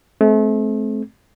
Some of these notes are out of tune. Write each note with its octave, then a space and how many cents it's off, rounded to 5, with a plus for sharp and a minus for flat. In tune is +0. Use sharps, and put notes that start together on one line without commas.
A3 -35 C4 +0